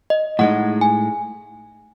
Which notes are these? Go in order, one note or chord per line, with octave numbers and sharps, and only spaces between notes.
D#5
A2 G#3 D#4 F#5
G#5